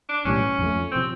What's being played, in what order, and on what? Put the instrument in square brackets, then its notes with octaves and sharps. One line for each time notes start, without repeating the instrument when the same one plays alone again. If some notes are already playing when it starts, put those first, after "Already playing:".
[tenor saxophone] D4
[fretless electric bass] B1 A2 E3 G3 [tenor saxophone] C#4
[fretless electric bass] F2 D3 F3 A3
[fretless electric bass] C3 F3 [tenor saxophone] C4